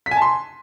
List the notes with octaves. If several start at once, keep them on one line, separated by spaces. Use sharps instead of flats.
B6
G#5
A5
C6